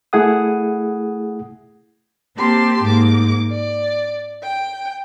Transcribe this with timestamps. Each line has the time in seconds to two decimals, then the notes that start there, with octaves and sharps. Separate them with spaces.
0.13 A3 E4 G#4 F#5 D#6
2.37 A#3 C4 G4 A5 C6
2.83 G#2 A#3 D6
3.51 D5
4.41 G5